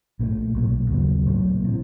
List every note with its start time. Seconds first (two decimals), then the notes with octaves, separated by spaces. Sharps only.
0.19 A#1 A#2 F3 A3
0.55 B1 A2 F#3 A#3
0.90 D#2 C#3 F#3 B3
1.26 A#1 A2 F#3 A#3
1.64 C3 E3